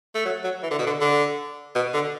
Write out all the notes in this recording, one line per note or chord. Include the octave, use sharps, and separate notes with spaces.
A3
F#3
F#3
E3
D3
B2
D3
D3
B2
D3